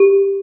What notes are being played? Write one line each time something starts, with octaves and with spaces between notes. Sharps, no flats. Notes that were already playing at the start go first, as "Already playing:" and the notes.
Already playing: G4